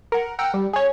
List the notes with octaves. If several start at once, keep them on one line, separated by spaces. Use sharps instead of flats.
A#4 F#5
F#5 G5 A#5 E6 F6
G3
G#4 C#5